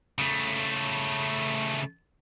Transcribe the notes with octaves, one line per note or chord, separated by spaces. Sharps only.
C#3 A3